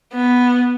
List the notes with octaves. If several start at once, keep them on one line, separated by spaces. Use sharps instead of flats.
B3